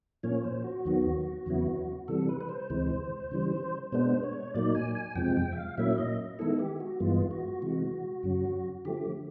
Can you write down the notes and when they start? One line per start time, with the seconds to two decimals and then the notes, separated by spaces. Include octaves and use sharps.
0.23 A#2 F3 A#3 C#4 C#5
0.44 C5
0.64 F#4
0.85 D#2 D#3 F#3 B3
1.46 E2 C#3 F#3 B3 E4
2.08 C3 E3 G3 A4
2.29 B4
2.41 B4
2.49 C5
2.70 D2 C3 E3 G#3
3.31 C#3 E3 G3
3.92 B2 G#3 B3 D4 C5
4.23 C#5
4.54 A#2 F#3 A#3 D#4 D5
4.75 G#5
4.95 G#5
5.15 F2 C3 F3 G#3 G5
5.37 G5
5.52 E5
5.57 F5
5.78 A#2 F#3 A#3 C#4 E4 E5
5.98 D#5
6.39 D#3 G#3 B3 E4 A4
6.59 G4
6.80 F#4
7.00 G2 E3 G#3 B3 F4
7.31 F#4
7.62 C3 E3 G#3
8.23 F#2 C#3 F#3
8.85 D3 F3 A3 G4